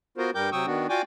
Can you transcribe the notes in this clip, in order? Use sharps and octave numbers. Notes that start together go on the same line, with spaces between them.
B3 F4 F#4 A#4 C5
G2 G3 A#4 G5 D6 G6
C3 F#3 G5 C#6 D#6 E6
D#3 B3 D4 F#4
F4 F#4 D5 G5 G#5 D6